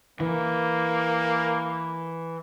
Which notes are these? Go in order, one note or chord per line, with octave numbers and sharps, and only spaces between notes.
E3 A#3